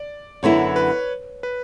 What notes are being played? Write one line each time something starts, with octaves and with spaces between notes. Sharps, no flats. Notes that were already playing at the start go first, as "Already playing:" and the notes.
Already playing: D5
F#2 D3 F#3 B3 E4 C#5
B4
B4